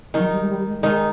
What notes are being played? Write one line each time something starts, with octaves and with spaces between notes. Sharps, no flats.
D#3 F#3 D#4
G3
G#3
G3
G#3
D#3 G#3 D#4